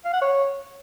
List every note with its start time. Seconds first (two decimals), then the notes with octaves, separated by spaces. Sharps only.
0.05 F5
0.13 F#5
0.21 C#5